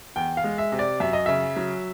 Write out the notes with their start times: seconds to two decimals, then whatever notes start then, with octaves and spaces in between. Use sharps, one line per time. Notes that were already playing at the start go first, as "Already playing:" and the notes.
0.16 E2 G5
0.37 F5
0.44 G#3
0.58 E5
0.72 C3
0.79 D5
1.00 F#2 E5
1.13 D#5
1.26 C#3 E5
1.56 F#3